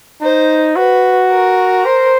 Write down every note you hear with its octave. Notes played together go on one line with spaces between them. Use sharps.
D#4 C5
F#4 B4
A#4
C5